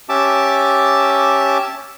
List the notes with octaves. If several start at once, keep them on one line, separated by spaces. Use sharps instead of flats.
C#4 G4 E5 A5 D6